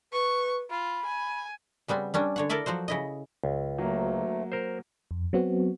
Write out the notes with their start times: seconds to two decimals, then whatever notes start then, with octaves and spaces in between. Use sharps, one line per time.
0.13 B4 C#6
0.70 F4 B5
1.06 G#5
1.88 C#3 G3 B3 C4
2.14 G3 C#4 D4
2.36 D3 C#5 F#5
2.49 E4 A4 A#4 D5 E5
2.66 F3 F#3 F#4 C5
2.88 C#3 E4 D#5
3.44 C#2
3.78 D2 F#3 A3 A#3
4.52 A#4 C5
5.11 F2
5.33 F#3 B3 C4 F#4